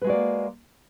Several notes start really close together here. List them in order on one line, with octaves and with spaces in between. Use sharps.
B4 G#3 F#4 D5 A#3